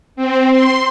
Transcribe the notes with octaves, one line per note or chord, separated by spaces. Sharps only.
C4
C6